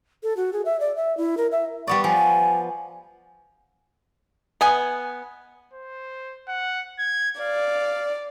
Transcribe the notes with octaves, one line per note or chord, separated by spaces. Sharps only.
A4
F#4
G#4
E5
D5
E5
E4
A#4
E5
G3 B3 D5 C#6
F3 G#5
B3 D#5 G#5
C5
F#5
G#6
D5 F5